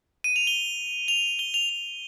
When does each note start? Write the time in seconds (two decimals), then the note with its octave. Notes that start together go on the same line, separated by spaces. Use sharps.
0.24 D#7
0.36 F7
0.47 G7
1.08 F7
1.39 G7
1.54 F7
1.69 F7